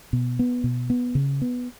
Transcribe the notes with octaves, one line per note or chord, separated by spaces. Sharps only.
B2
B3
B2
B3
C#3
B3